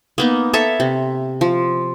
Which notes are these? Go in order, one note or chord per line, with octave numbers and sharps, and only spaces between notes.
A#3 B3 D#4
A4 C#5 E5 A5
C3
F3